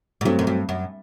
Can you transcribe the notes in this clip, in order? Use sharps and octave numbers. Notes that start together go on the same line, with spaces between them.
G#2
G2 F#3 A3 C4
F#2
G2
F#2